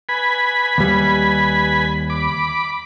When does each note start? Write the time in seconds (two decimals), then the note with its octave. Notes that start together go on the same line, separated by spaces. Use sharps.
0.09 B4 G#5 B5
0.78 D#2 G3
2.10 B5 D6